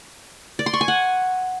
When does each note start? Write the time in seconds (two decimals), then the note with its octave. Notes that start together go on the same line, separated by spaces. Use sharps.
0.59 D5
0.66 C6
0.73 C#6
0.81 G#5
0.88 F#5